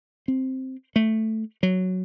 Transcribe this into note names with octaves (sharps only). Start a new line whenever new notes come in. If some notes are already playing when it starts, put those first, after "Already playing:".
C4
A3
F#3